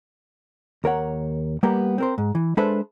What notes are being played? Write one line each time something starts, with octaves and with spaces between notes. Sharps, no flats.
D#2 A#4 C#5 F#5
G3 A#3 B3 G4 A#4
C4 A#4 C5
G#2
E3
G#3 D4 A4 B4 C5 E5